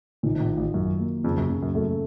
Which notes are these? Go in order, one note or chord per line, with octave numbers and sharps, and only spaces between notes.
A#1 A#2 D#3
C3
A#1 A#2
F4
A1 A2
F#2 F#3
A#3
F2 C#3
F#2
C#3
F#2
F#2 A3